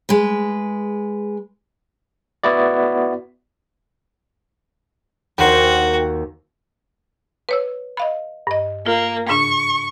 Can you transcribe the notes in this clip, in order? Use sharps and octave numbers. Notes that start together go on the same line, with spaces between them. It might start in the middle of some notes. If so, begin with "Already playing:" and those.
G#3 B4
B3 E4 F#4 D5
D#2 F#4 A#4 C5 F#5 G5
B4 C#5 E6
D#5 F5 B5
G2 D#5
A#3 F4
G#2 C#3 D4 C#6